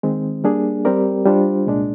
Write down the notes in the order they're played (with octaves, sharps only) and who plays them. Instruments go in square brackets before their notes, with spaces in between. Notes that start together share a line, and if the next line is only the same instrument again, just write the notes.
[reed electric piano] D#3 G#3 C4
G3 A#3 D4 G#4
G3 C4 G4 A#4 D5
G3 D4 F4 C5
C2 A#2 G#3 D4